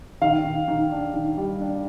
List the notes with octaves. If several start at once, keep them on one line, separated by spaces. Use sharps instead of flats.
D#3 F5
D#3
D#3
D4
D#3
G3
D4